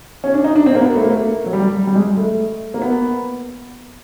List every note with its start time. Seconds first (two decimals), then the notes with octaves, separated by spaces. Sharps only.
0.24 C#4
0.34 D4
0.44 D#4
0.56 D4
0.66 C4
0.75 A#3
0.81 B3
0.96 A3
1.04 A#3
1.09 A3
1.46 F#3
1.53 G3
1.87 G3
1.96 G#3
2.17 A3
2.74 A#3
2.82 B3